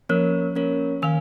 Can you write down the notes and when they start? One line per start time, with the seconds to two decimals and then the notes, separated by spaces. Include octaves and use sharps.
0.09 F3 A#3 C#4 A#4 C#5
0.55 A#3 C#4 A#4 C#5
1.02 D#3 F5 G#5